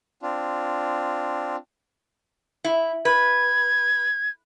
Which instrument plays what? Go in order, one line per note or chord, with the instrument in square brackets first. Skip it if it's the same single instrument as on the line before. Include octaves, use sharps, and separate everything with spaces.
[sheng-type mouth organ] C4 D4 F4
[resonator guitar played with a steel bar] E4
[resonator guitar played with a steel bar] B4 [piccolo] G#6